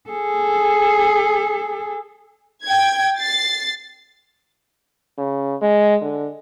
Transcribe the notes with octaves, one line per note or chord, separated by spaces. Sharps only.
G#4 A4
G5 G#6
A6 C7
C#3
G#3
D3